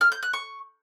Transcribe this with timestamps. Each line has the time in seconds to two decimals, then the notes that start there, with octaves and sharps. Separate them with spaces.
0.01 F6
0.12 G6
0.23 F#6
0.33 C#6